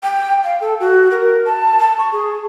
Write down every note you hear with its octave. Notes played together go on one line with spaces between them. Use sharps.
G5
F5
A4
F#4
A#4
A5
A5
C#6
G#4